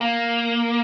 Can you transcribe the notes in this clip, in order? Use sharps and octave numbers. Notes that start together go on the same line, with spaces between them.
A#3